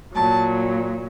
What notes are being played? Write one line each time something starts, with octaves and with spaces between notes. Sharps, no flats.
A#2 F#3 A5